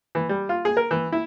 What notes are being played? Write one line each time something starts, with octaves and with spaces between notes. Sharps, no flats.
E3
G3
F4
G#4
A#4
E3
E4